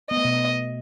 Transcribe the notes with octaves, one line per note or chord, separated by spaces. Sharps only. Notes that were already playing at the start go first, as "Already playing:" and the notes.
B3 D#5
A3
B2 B3